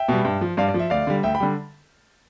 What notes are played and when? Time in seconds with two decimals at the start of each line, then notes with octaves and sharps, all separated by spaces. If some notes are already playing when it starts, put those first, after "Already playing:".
Already playing: E5 G5
0.09 B2 G3
0.25 G2
0.41 F3
0.57 G2 D5 F5
0.68 D5
0.74 F3
0.79 E5
0.90 D2 D5 F5
1.07 D3 G3
1.23 D2 E5 G5
1.35 G5 B5
1.40 D3 G3